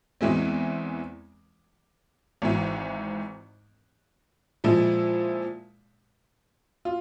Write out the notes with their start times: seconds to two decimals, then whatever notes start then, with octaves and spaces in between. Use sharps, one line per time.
0.21 E2 E3 G#3 C4
2.42 G#1 G#2 E3
4.64 A#2 F3 G#3 E4
6.85 F4